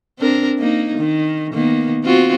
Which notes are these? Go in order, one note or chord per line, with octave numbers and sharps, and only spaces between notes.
C4 D4 A#4
A#3 D#4
D#3
D#3 A#3 B3
C4 F4 F#4